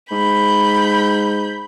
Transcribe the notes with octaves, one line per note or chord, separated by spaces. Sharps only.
G#2 B5 G6